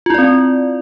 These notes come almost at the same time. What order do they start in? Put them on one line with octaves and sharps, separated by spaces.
F4 E4 D5 C4